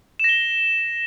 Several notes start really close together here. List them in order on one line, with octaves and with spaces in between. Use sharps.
E7 A#6 G7